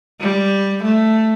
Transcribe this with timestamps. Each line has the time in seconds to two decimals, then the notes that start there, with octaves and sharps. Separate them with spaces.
0.21 G3
0.84 A3